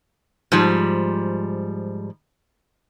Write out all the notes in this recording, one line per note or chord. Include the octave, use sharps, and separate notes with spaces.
G#2 F3 G3